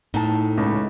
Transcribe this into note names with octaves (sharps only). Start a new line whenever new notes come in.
A2 D#4 A5
C#2